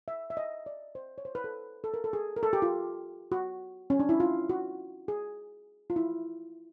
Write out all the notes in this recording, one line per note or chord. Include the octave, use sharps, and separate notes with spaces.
E5
E5
D#5
D5
C5
C#5
C5
B4
A4
A4
A#4
A4
G#4
A#4
A4
G4
F4
F#4
C#4
D4
E4
F4
F#4
G#4
F4
E4